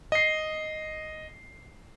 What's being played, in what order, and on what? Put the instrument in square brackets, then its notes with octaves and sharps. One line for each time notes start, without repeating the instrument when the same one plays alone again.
[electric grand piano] D#5 C7